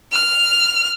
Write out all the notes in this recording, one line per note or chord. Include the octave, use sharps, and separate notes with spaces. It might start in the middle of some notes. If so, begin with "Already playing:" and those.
F6